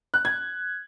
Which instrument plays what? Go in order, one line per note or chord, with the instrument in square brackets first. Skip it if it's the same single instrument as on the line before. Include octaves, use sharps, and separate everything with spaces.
[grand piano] F#6
G#6